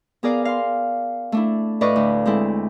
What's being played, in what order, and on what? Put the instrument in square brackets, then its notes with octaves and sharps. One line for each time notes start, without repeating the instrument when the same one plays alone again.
[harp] B3 G#4 A#4 D5 F5
F5 C6
A3 D4 E4
A2 B4 D5 D#5 F5 C#6
D2
G#3 C4 E4 A4